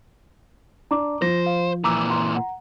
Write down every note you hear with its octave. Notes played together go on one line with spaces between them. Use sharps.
D4 A#5 D6
F3 C5 A#6
F5
A#2 E3 A#5 D6 E6
A#5 C6
F#5